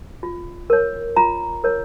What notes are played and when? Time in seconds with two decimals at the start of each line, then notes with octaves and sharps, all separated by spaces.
0.23 F4
0.70 A#4 C#5
1.16 F4 A#5
1.64 A#4 C#5